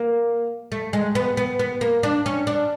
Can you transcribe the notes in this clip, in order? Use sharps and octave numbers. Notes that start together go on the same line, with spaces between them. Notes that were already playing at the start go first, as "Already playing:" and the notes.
Already playing: A#3
A3
G#3
B3
B3
B3
A#3
D4
C#4
D4